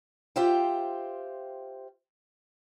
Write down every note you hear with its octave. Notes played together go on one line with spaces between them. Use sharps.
F4 G4 C5 E5 F5 G5